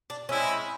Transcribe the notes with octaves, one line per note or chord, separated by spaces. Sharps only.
D4
G#3 C4 C#4 E4